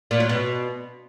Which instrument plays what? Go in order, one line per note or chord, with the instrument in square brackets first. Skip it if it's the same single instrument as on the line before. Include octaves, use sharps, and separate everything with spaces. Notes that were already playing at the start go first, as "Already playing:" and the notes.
[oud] A#2
F#3
B2